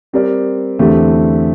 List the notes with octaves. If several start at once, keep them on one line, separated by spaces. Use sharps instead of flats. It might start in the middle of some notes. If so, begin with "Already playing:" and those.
G3 C4 G4 A#4 D5
E2 D3 A3 C4 G4